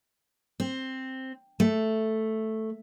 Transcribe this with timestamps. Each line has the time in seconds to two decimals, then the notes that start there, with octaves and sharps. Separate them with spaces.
0.60 C4
1.60 A3